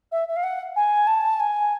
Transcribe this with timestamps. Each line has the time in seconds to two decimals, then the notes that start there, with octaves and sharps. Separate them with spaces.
0.12 E5
0.28 E5
0.36 F5
0.43 F#5
0.76 G#5
1.07 A5
1.40 G#5